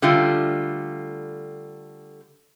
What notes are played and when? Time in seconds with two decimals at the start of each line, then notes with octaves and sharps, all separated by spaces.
0.02 D3 G3 A3 F4